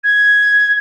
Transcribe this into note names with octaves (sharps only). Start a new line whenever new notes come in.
G#6